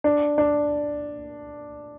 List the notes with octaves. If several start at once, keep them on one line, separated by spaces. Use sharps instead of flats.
D4
D4